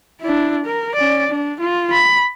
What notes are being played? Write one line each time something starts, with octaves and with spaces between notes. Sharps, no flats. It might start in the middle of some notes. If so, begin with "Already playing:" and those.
D4 E4
A#4
C#4 D5
D4
F4
B5